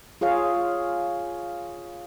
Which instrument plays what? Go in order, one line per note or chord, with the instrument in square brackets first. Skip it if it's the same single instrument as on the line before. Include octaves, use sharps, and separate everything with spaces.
[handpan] F4 G#4 C#5 F5